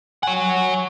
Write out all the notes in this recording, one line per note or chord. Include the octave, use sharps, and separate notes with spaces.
C#5 F#5 G#5